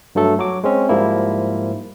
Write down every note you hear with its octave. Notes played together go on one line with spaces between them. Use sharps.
G2 F#3 A3 A4
F#3 F#4 D6
G#3 C4 C#4
G#2 F3 G3 A#3 E4